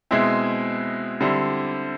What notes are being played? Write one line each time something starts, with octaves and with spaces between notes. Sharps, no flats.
B2 G#3 C4 E4
D3 G3 C4 E4